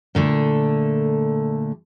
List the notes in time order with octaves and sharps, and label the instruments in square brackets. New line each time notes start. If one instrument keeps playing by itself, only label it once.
[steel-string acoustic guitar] A#2 D3 A3